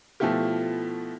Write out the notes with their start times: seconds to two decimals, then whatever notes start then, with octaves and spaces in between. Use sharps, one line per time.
0.20 B2 F3 A3 E4 F4 G4